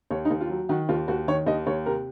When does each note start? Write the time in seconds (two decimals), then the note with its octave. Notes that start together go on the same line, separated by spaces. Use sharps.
0.11 D#2 C#5
0.25 D#4
0.30 D#2
0.41 F4
0.50 F#3
0.69 D#3 F#4
0.89 D#2 F4
1.08 D#2 F#4
1.28 D#3 C#5
1.46 D#2 D#5
1.66 D#2 C#5
1.86 C3 A#4